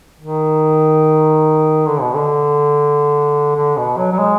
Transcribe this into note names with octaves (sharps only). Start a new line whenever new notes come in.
D#3
D3
B2
D3
D3
B2
F#3
F#3
G#3